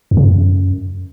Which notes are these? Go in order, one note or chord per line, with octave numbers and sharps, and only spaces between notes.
F2
C#3
F#2